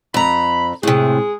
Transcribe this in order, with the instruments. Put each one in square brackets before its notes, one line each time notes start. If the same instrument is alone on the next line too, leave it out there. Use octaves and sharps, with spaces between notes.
[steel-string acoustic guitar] F2 A#5 [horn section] B5
[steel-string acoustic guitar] A2 C3 [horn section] G#3 G#4